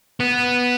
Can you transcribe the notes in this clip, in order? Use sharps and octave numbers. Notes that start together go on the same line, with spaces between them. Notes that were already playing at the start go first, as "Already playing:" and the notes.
B3